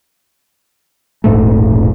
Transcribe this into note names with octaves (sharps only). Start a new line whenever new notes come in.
E1 A#1 G#2 A3